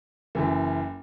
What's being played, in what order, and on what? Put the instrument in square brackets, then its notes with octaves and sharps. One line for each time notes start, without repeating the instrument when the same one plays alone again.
[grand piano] F#1 F#2 E3